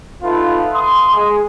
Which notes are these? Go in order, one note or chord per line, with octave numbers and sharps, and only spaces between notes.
B3 D#4 F4 A4 B4 E5
C6 D#6
G#3 G#4